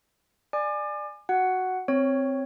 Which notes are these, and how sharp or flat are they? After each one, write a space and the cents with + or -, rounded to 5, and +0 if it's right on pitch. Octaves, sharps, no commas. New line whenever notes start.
D5 +20 G#5 +0 D6 +35
F#4 +0 F#5 +5
C4 +0 C#5 +0